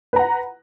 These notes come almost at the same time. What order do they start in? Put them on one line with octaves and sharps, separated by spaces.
B4 A#5 F#5